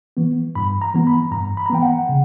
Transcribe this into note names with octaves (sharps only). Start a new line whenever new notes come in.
E3 B3
G2 B5
A#5
E3 B3
B5
G2 A#5
B5
A#5
E3 B3 G5
F#5
C#3